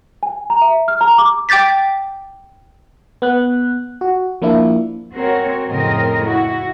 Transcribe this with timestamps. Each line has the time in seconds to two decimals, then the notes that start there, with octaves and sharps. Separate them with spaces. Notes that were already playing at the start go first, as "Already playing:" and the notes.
0.23 G#5
0.50 A#5
0.62 E5
0.88 F6
1.01 A#5
1.18 D6
1.49 G5 D6 G6 A6 B6
3.22 B3 F#6
4.01 F#4
4.42 F3 A#3 D4 E4
5.14 C4 F#4 A#4 C#5
5.68 F2 A2 C#3 C4 A#4 D#5
6.25 E4 F#4